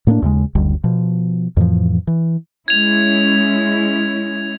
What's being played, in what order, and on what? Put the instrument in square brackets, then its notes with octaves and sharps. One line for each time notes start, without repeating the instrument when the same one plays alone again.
[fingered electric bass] A2 A#3 C#4 D4
D#2 C#3 G#3
F#1 D2 D3 G3
B2 F3
F2 A2 E3 F3
E3
[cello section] G#3 C#4 E4 [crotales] G#6 F7